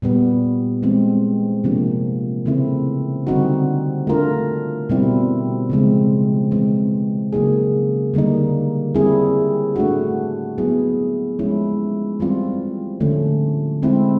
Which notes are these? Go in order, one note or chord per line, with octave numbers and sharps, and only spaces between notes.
A#2 G3 B3
E3 G#3 C4
C3 F3 A#3 D4
C#3 E3 A3 C4 E4
D3 G3 C4 D#4 F#4
A3 D4 F4 A#4
B2 G3 C4 E4
C#3 F3 G#3 C4
E3 G#3 C4
C#3 F#3 A#3 D#4 G#4
D3 G3 A#3 D#4
G3 C4 E4 G#4
A3 D4 F#4
F#3 B3 E4 G#4
F3 G#3 C#4 E4
E3 G3 C4 F4
D3 F3 A3 C#4
G#3 C4 E4